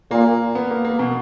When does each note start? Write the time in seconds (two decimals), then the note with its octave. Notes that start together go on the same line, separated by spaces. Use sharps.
0.11 A#2 A#3
0.55 B3
0.71 A#3
0.85 A#3
0.99 B2